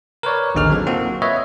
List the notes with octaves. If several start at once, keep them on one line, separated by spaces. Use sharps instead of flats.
A#4 B4 C#5 D5
A1 D#2 D3 D#4 G#4 F6
F#3 C4 A4
A#3 C4 F4 F#4
B4 C#5 D#5 E5